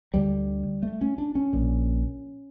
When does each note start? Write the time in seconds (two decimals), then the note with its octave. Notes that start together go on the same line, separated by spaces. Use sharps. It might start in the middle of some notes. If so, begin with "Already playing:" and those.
0.14 D2 D3 G3
0.83 A3
1.01 C#4
1.18 D4
1.35 C#4
1.53 A#1 A#2